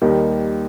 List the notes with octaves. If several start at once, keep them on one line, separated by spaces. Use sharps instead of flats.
D#2 D#3 G3 A#3 D#4